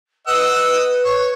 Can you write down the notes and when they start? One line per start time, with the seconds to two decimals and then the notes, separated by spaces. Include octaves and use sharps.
0.27 B4 D#5 F#5 E6
1.05 C#5